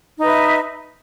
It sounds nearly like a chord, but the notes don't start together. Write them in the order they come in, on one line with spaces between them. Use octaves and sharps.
D#4 B4 E5